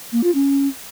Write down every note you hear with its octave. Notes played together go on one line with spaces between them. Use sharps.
A#3
F4
C#4